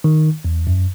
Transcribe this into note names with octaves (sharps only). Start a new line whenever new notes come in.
D#3
E2
F#2